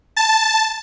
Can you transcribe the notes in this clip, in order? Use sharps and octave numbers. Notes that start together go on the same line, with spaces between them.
A5